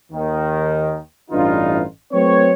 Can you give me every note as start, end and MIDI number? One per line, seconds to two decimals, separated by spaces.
0.13 0.97 39
0.13 0.97 51
1.31 1.82 33
1.31 1.82 43
1.31 1.82 52
1.31 1.82 62
1.31 1.82 63
1.31 1.82 65
2.13 2.53 54
2.13 2.53 57
2.13 2.53 60
2.13 2.53 71
2.13 2.53 73